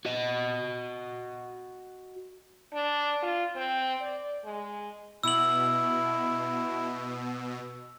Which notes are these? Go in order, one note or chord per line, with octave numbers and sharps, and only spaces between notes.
F#4 D#5
D4
F4
C4
D5
G#3
B2 E4 E6 F#7